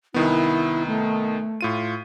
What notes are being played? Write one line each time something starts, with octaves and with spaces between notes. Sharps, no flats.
C2 D#3 B3 E4
A3
A2 F4 D#7